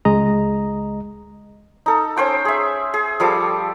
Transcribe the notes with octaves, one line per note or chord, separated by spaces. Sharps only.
C#2 G#3 D#5 A#5
D#4 A4
C#4 C5 G5 C#6
G#4 E5
G#4
F3 G3 A4 D6